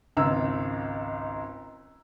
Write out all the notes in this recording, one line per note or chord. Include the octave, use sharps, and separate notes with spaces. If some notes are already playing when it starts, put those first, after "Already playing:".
G#1 C#2 A#5 E6